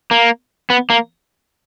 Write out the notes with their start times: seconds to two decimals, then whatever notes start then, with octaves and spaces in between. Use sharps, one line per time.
0.11 A#3
0.70 B3
0.90 A#3